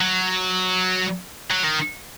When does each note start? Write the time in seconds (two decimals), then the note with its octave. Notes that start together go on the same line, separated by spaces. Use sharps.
0.01 F#3
1.51 F#3
1.64 D#3